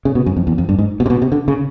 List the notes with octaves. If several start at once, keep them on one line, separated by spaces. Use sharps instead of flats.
C#3
B2
F#2
F2
E2
F2
G2
G#2
B2
C3
B2
C3
D3
C#3